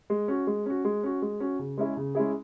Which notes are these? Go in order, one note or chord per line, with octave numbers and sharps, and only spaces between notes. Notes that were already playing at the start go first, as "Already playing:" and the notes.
G#3
C#4 F#4
G#3
C#4 F#4
G#3
C#4 F#4
G#3
C#4 F#4
C#3
G#3 C#4 E4 G#4
C#3
G#3 C#4 E4 G#4